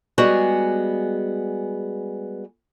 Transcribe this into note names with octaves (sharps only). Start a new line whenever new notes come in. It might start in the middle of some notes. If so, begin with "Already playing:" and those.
G3 G#3 B3 F#4 G#4